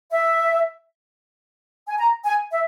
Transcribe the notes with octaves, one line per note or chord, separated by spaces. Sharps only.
E5
G#5
A#5
G#5
E5